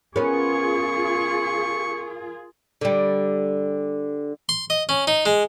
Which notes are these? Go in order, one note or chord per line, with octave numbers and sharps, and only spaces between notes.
B3 C#4 F4 G#4 A#4 C#6
D3 G3
C6
D#5
C#4
D#4
G#3